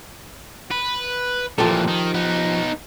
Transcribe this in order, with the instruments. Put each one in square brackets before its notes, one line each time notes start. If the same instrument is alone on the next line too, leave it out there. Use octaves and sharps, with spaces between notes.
[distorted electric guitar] B4
[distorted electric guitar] A#2 E3 [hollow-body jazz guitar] F3 G4 A4
[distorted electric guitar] D#3
B3 D#4